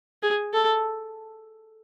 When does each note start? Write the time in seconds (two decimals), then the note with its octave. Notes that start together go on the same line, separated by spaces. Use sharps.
0.23 G#4
0.53 A4